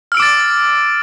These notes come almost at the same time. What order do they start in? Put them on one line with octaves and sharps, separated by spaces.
F6 E6 D7 D6 A6